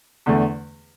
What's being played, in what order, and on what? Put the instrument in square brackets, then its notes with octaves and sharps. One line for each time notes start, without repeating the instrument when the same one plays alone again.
[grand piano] E2 D3 A3